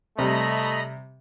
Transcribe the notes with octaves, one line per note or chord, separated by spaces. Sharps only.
C3 G3 A3 D#5 A#5 B5